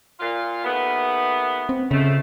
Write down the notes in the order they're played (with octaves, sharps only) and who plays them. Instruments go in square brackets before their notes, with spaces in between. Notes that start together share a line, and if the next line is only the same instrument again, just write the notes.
[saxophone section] A#2 F4
D#2 A3 B3
[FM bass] C4
[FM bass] C#3 [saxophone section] F3 G#3 A3